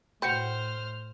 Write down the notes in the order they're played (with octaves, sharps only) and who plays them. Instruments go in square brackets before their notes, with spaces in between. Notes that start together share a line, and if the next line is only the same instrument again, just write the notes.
[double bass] A2 [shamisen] F#4 B4 [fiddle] C5 F6 [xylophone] G5 G6 C#7